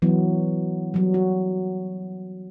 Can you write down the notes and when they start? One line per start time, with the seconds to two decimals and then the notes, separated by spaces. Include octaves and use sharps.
0.02 E3 F#3 B3
0.94 F#3 G3
1.14 F#4